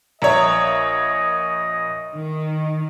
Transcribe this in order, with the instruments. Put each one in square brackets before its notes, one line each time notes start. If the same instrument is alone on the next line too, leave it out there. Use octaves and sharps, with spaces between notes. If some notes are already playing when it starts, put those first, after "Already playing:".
[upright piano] A#1 C#5 [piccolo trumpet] D#5 [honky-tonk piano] E5 A#5
[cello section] D#3